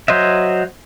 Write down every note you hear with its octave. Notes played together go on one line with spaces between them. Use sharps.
F#3 C5 D#5 E5